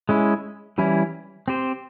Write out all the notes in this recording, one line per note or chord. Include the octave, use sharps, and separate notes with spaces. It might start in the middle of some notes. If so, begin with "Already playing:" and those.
G#3 C#4 E4
E3 G3 C#4 E4
C4 G4 C5